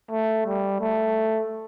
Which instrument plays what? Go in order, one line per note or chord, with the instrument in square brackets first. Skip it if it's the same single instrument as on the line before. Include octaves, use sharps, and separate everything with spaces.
[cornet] A3
G3
A3